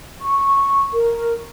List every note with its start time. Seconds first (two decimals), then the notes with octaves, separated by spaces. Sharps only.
0.23 C#6
0.93 A#4